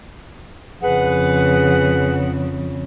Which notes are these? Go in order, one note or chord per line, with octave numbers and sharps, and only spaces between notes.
F2 C#3 G#4 B4 F#5